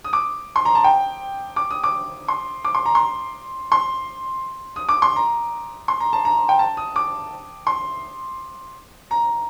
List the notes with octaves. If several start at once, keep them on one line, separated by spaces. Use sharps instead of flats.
D#6
D6
C6
A#5
A5
G5
D6
D#6
D6
C6
D6
C6
A#5
C6
C6
D#6
D6
C6
A#5
C6
A#5
A5
A#5
G5
A5
D#6
D6
C6
A#5